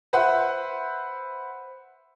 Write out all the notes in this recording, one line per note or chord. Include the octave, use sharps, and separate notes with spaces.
B4 C5 E5 F#5